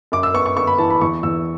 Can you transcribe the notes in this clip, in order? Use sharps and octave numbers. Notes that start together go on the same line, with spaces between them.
F#2 D6
E6
B3 C#6
C#6
B3 C#6
B5
E3 A5
B5
E2 C#6
E2 E6